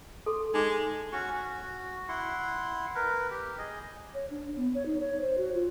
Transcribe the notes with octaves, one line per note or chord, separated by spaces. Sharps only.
A4 C6 D6
G#3 D#4 D6
C#4 F#4 C#6
F#4
E4 F#5 C6
A#4 B4
G4
G#4 D#5
C#5
D4
B3
C#5
D#4
C#5
C5
F#4
F4